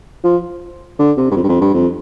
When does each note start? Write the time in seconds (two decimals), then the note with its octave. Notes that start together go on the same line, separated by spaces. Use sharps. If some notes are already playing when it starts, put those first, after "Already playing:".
0.24 F3
0.99 D3
1.17 C3
1.31 G2
1.36 F2
1.43 G2
1.49 F2
1.61 G2
1.74 F2